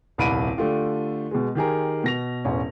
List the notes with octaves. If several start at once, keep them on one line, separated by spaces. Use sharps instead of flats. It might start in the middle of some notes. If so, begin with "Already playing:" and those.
D#1 C2 B5 D7 D#7
D3 A3 F4 G4
B2 G#3
D#3 G4 G#4 A#4
B2 A#6 F7
E1 A1 C#4